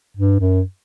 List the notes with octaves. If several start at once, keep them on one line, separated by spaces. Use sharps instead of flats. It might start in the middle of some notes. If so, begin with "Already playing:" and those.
G2
F#2